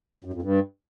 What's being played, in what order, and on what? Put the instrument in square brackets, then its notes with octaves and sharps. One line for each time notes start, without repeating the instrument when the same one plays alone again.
[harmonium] F#2
F2
G2